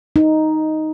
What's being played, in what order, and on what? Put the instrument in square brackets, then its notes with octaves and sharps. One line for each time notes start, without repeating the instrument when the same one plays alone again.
[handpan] D#4